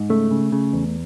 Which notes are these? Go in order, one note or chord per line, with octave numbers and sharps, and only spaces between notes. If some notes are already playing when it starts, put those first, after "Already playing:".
Already playing: G#2
C#3 A3
C#3
C#3
E2